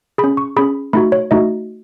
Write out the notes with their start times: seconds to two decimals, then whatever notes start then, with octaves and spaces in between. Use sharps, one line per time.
0.18 G#4 B5
0.24 C#4
0.37 C#6
0.56 C#4 G#4 B5
0.93 A3 D#4 F#4 B5
1.12 C#5
1.31 A3 D#4 F#4 D#5